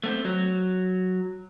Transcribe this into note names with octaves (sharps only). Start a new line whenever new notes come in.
A3 B3 C4
F#3